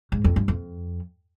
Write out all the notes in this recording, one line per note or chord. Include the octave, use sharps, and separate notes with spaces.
G#2
F2
G2
F2